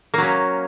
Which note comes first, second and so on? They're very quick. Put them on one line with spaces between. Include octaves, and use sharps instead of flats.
A#3 F#3 C#4